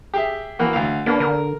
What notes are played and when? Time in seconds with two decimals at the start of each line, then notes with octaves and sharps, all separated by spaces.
0.14 G4 G#4 E5
0.59 E3 A#3 F#4
0.73 D2 F5
1.06 A#3 B3 D4
1.20 D3 A#4